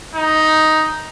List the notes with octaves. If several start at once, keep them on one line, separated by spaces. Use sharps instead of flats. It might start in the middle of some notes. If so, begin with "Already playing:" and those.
D#4